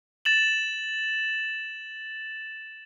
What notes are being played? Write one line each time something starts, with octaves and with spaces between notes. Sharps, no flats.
A6 E7 F#7